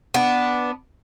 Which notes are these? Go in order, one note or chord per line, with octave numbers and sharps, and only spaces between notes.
B3 D4